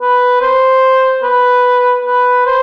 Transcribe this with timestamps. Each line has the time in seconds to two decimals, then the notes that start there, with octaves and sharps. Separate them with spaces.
0.01 B4
0.41 C5
1.23 B4
2.05 B4
2.46 C5